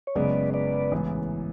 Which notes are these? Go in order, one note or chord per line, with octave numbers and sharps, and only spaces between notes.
C#5
F#1 F#2 C#3 G#3 B3 B4 D5
B4 D5
A1 G#2 E3 B3